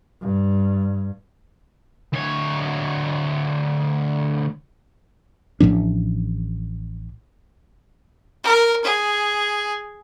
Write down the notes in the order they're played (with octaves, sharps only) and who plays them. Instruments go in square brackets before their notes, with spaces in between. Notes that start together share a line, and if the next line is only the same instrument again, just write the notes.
[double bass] G2
[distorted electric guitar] D2 C#5
[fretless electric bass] A1 A2 F3 D4
[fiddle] A#4
G#4